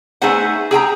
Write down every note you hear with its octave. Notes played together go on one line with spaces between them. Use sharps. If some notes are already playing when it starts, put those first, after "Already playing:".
A3 B3 D#4 G#4 C5 F#5
G#4 G5 G#5 A#5